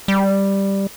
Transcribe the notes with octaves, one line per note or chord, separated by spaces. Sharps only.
G3